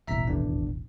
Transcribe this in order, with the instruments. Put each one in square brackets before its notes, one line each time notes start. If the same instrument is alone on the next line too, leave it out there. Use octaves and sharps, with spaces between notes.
[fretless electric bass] D#1 A1 B2 [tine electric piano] E5 A#5 B6
[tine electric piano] G#1 E2 D4